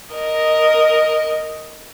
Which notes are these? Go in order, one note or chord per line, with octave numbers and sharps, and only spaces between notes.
A#4 D#5